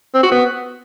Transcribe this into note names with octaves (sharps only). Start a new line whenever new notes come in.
C4
F#4
B3